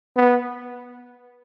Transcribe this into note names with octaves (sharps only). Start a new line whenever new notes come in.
B3